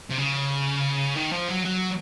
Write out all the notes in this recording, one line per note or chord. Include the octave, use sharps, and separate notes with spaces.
C3
C#3
D#3
F3
F#3
F#3